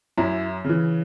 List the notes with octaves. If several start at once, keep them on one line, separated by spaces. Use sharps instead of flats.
F#2 E4
C#3 E3